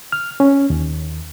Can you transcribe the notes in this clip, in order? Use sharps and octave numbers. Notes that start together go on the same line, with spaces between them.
F6
C#4
D#2